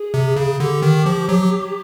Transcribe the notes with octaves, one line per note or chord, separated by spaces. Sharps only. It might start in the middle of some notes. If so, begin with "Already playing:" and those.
Already playing: G#4
C3
C#3
D3 G4
D#3
F3
F#3